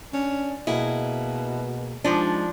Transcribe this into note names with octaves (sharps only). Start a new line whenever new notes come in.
C#4 D4
B2 A#3 E4 G#4 D#5
F3 G#3 D4 D#4